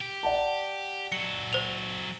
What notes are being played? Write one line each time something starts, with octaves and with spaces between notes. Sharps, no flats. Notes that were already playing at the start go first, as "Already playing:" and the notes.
G4
D5 F#5 A5
F#3 A4 C#7
C5 F7